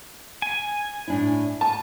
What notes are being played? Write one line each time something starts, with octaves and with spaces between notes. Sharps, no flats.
G#5
A2 D4 E4
G#5 A5